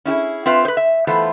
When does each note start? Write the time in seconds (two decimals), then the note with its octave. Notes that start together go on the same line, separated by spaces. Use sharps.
0.05 C#4 E4 G4 G#4
0.46 C4 F4 B4 E5
0.65 B4 C5
0.77 E5
1.07 E3 A3 B3 F4 A4 C5